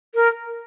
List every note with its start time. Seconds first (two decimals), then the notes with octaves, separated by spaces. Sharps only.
0.15 A#4